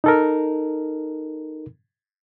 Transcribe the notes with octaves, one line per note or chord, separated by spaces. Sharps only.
D#4 A4 A#4